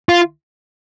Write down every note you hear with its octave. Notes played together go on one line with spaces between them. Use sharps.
F4